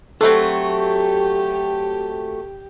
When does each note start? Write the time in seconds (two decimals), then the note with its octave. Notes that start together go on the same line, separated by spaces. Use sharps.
0.21 F#3 A3 C4 G4 A4